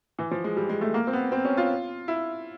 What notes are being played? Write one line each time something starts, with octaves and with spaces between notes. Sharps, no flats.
E3
F3
G#3
G3
G#3
A3
A#3
C4
B3
C4
C#4
F4
E4